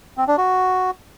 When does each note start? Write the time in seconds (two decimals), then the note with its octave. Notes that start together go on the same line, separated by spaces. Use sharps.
0.17 C4
0.27 D4
0.38 F#4